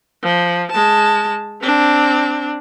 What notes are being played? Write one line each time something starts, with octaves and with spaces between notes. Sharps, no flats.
F3
G#3 A5
C4 D4